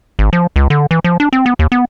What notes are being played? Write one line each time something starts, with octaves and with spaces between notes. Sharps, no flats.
G#1
F3
C#2
D3
E3
F3
D4
C4
B3
D#2
B3